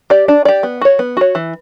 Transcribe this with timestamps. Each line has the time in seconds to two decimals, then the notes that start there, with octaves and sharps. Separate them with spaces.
0.10 G4 D5
0.28 D4
0.45 G4 D5
0.63 B3
0.81 F#4 C#5
0.99 B3
1.17 F#4 C#5
1.35 E3